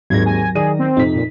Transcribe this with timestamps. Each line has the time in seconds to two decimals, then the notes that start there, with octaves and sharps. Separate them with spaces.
0.10 G#1 D#2 G#2 F#3 G#6 A#6
0.26 G#5
0.55 D#3 G#4 D5 D#7
0.79 C4
0.97 F2 C3 D#4 B6
1.16 A#2